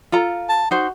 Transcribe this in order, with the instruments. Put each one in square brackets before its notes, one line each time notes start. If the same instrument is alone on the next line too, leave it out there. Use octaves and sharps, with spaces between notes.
[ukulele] F4 A4 A#5
[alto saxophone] A5
[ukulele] D#4 C5 [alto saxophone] F#4